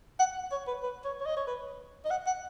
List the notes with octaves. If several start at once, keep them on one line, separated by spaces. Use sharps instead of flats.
F#5
C#5
B4
B4
C#5
C#5
D#5
C#5
B4
D#5
F#5
F#5